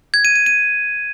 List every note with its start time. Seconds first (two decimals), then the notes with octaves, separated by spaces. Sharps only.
0.14 G#6
0.25 D#7
0.35 D#7
0.46 D#7